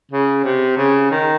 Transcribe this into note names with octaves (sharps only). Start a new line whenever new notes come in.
C#3
C3
C#3
D#3